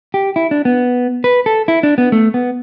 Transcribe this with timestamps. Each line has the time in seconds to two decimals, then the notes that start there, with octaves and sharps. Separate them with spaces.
0.14 G4
0.36 E4
0.51 D4
0.65 B3
1.24 B4
1.46 A4
1.68 E4
1.83 D4
1.98 B3
2.12 A3
2.34 B3